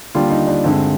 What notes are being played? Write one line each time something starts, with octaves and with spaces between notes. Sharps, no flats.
D#2 D3 G3 F4
D#4
D4
G2 D3 G#3 C4